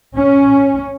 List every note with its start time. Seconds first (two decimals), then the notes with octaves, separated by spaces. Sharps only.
0.16 C#4